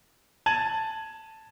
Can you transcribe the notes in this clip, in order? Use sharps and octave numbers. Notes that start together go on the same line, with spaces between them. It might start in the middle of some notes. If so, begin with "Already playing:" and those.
A5 G#6 D#7 F#7